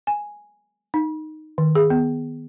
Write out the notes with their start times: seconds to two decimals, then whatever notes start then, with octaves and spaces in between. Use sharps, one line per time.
0.07 G#5
0.94 D#4
1.58 D#3
1.75 G#4
1.90 B3